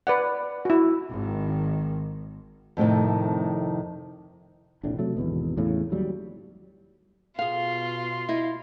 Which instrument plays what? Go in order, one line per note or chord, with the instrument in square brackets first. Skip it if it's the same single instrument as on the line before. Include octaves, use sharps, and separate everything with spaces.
[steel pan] B4 D5 F#5
E4 F#4
[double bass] G#1 D#3
[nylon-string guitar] F2 A2 C3 D#3
[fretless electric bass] F1 A#1 A2 D4
C3 F#3 A3
G#1 E2 B2
E2 A2 C#3
D#2 F#3 G3
[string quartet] B2 F4 C6 [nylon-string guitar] G#4 F5
[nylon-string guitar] E4 D#5